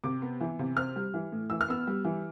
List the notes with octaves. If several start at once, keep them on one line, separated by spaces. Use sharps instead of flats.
C3 D6
B3
E3
C3
C4 F6
G3
E3
A2
E3 E6
F6
B3 E6
G3
E3